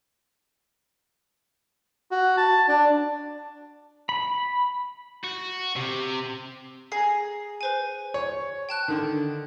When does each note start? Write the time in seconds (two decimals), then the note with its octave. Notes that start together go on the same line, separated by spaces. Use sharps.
2.11 F#4
2.37 A5
2.68 D4
4.09 B5
5.24 F#4
5.76 C3
6.92 G#4 A#5 C7
7.61 B4 C5 G#5
8.14 C#5
8.69 G5 A5 F#6
8.88 D3 D#3